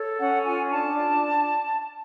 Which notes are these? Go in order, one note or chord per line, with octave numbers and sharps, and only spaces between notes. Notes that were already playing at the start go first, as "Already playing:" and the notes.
Already playing: A4 C#5
C#4 F#5
F4 G#5
D4 A5
D4
D4